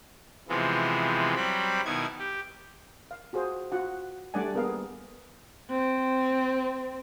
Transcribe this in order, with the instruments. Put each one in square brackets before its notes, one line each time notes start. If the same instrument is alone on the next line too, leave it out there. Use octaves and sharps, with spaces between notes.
[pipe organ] C3 E3 F3 G#3 B3
F#3 G3 C4 B5
B2 D#3 B3 E4 G#6
G4
[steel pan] F5
F4 F#4 G#4 C5
F4 F#4 F#5
G3 A3 D4 D5 F#5 G#5
A#3 B3 G#4 A#4 F5
[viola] C4